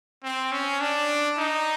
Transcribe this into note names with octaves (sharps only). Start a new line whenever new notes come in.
C4
C#4
D4
D#4